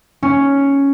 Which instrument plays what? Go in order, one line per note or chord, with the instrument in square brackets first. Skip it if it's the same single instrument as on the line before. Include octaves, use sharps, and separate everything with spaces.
[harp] C#4